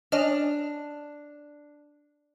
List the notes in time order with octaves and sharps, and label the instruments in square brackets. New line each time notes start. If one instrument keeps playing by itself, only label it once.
[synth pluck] C#4 D#5 F6 [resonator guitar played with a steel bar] D4